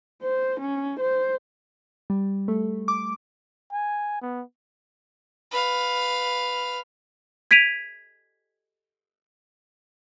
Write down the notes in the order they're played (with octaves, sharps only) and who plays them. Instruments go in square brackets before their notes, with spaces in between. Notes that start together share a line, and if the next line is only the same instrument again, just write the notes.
[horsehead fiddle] C5
C#4
C5
[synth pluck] G3
A3
D6
[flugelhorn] G#5
B3
[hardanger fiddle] B4 F5
[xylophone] G#6 B6 D7 D#7 F7